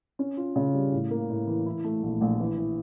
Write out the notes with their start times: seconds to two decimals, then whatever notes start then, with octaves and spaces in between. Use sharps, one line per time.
0.19 C#4
0.37 F4
0.56 C#3
0.74 G3
0.93 A2
1.11 A#3
1.30 A2
1.47 E3
1.66 E4
1.84 A3
2.03 A#1
2.21 A#1
2.40 E3
2.57 E3